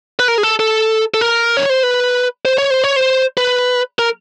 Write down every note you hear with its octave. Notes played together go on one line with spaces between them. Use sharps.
B4
A#4
G#4
A4
A4
A4
A#4
C#5
C5
B4
C5
C#5
C5
C#5
C5
B4
A#4